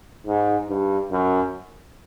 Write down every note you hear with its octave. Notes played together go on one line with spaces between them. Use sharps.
G#2
G2
F#2